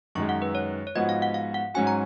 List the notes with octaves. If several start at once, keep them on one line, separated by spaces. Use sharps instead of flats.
F#2 D#3 G#3 C#6
F#5
B4
C#5
C#5
G#2 F3 B3 F#4 D#5
F5
F#5
F5
F#5
G#2 F#3 C#4 F#4 G#5
A#5